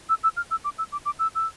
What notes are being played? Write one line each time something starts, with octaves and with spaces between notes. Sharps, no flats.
E6
E6
F6
E6
D6
E6
D6
D6
E6
E6